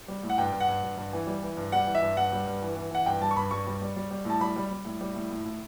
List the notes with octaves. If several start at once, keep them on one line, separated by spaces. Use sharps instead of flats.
G3
A2
F#5
G2 G5
G2
F#5
G2
G2
G2
E3
G3
E3
G2
G3 F#5
E3
E5
G2
G2 F#5
G3
G2
E3
E3
E3 F#5
G2 G5
G3 A5
C#6
G2 B5
G2 C#6
G3
G3
G3
G3
A2 A5
G3 B5
G3
G3
A2
G3
A2
A2
A2